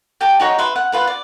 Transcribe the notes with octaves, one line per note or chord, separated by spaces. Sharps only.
G4 G5 A5
D#4 F#4 C#5
B4 E5 C6
F#5
F4 B4 F#5
D5